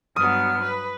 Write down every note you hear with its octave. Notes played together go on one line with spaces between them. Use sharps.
G2 F#3 B3 D#6 F6
B4